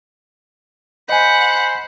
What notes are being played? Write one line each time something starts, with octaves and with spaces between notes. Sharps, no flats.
C5 D#5 F#5 G#5 B5